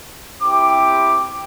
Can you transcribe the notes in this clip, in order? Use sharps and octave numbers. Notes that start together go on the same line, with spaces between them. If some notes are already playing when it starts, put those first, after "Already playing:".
C4 E4 G4 D6